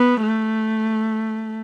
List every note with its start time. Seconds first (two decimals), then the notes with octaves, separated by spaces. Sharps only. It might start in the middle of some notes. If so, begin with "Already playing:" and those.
Already playing: B3
0.23 A3